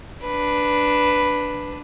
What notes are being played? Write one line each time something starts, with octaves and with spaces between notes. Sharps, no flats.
D4 B4